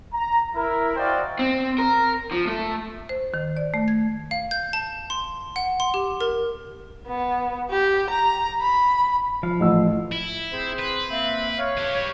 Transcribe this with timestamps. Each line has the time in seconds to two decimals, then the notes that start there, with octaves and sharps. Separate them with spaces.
0.14 A#5
0.55 E4 A#4
0.96 F#4 C5 D5 D#5 F5 G5
1.39 C4
1.78 A#4
2.32 F3
2.47 A3
3.09 C5
3.34 D#3
3.57 D5
3.74 A3
3.88 G#6
4.31 F5
4.51 G6
4.73 A5
5.10 C6
5.56 F#5
5.80 C6
5.94 G4
6.21 A#4
7.07 B3
7.70 G4
8.10 A#5
8.61 B5
9.43 F3 F5
9.60 A1 E6
10.12 E4
10.52 C4 G#4 C5
10.79 B4
11.10 A#3 C4 E5
11.57 C#5 F5
11.78 G4 B4